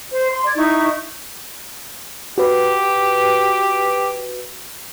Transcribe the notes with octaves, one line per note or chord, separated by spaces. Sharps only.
C5
C6
D5 G#6
D#4 E4 C#6
F#4 G4 B4